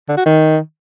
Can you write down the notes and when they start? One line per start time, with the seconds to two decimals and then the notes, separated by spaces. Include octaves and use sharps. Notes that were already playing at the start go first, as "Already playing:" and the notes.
0.09 D3
0.17 F#4
0.26 D#3